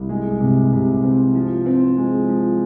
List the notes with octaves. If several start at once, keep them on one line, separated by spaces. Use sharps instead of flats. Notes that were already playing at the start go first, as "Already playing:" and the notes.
Already playing: C2
G#3
C3
C3
C4
F3
C4
G#3
F3